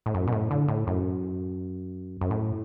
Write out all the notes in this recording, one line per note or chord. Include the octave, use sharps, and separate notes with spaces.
A2
F#2
B2
A2
D3
A2
F#2
F#2
A2